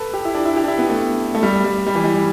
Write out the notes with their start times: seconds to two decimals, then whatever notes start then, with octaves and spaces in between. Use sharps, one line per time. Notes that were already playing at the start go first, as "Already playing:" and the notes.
Already playing: A4 B4
0.13 G4
0.25 E4
0.35 D4
0.45 E4
0.56 G4
0.64 D4
0.68 E4
0.78 B3
0.90 A3
1.35 A3
1.43 G3
1.64 G3
1.86 G3
1.95 E3
2.04 G3